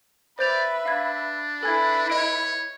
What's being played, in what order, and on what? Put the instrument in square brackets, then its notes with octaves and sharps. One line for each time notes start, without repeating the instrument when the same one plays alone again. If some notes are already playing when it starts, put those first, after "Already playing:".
[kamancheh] B4 E5 [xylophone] C5 G6 F7 [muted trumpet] D5
[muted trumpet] D4 [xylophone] F5 G#6
[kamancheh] E4 B4 [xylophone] A4 G#5 G#6
[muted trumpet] C#5 [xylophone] D#5 D7